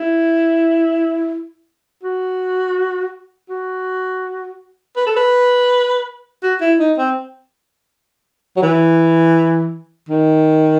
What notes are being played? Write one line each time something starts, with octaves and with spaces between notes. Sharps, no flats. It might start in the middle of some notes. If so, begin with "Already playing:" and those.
Already playing: E4
F#4
F#4
B4
A4
B4
F#4
E4
D#4
C4
F#3
E3
D#3